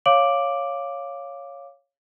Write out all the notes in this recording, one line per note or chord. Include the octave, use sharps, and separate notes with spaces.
C#5 F5 D6 D7 F#7